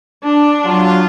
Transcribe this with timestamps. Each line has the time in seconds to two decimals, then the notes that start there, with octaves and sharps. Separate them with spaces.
0.24 D4
0.65 F#3 F4